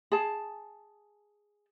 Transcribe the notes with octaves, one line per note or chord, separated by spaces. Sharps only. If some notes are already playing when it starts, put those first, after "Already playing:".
G#4 A5